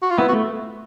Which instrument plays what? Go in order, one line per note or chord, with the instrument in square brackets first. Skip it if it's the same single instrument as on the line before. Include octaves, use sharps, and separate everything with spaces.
[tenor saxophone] F#4
F4
[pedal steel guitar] B3 [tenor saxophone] E4
[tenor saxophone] F#4
[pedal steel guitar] A3